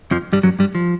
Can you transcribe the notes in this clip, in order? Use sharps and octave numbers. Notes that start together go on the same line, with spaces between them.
F2 F3
G2 G3
F#2 F#3
G2 G3
F3